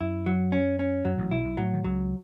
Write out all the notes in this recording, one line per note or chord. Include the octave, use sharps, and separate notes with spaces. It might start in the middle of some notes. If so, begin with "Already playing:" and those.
F#2 E4
F#3
C#4
C#4
F#2 F#3
A1 A2
B1 B2 E4
B1 B2
A2 F#3 A3
D#3
C#2 C#3 F#3